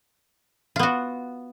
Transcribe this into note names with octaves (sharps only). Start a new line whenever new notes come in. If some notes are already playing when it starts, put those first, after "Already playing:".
B3 F4 F#4